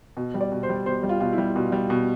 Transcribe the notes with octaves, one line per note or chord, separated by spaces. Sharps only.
B2
G3
D5
B2
C5
G3
B2 C5
G3
F4
B2 F4
E4
G3
B2
G3
B2